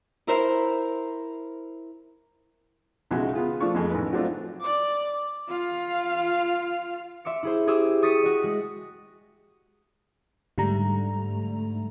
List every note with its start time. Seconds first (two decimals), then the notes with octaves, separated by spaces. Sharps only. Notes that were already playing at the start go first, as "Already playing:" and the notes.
0.27 E4 A#4 C5 E5
3.11 B1 C#3 G#3 F4 F#4 E5
3.34 B3 F4 G#4
3.60 F3 A3 D4 F5 C#6
3.75 F2 G#3 A3
3.91 A1 D#3 B4
4.13 F#3 A3 C4 D4 D#4 F4
4.60 D5 D6
5.49 F4 F5
7.25 E5 C6 D6 C#7
7.43 E4 G#4 C5
7.67 G4 G#4 C5 D6 E6
8.02 C#6 D#6 A6 B6 C#7 D#7
8.23 F#4 D#5
8.43 G#3
10.58 G#2 D3 G3 A3 A#5